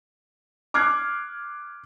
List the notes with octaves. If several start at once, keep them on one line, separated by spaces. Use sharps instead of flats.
D6 F6 F#6 G#6 C7